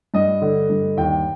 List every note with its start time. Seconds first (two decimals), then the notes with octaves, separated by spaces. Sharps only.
0.14 G2 D#5
0.42 D3
0.70 G2
0.97 D#2 G5